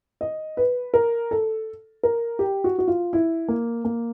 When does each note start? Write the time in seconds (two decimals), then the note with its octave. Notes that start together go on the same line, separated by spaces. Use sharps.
0.21 D#5
0.57 B4
0.94 A#4
1.31 A4
2.03 A#4
2.39 G4
2.64 F#4
2.79 F#4
2.88 F4
3.13 E4
3.48 A#3
3.85 A#3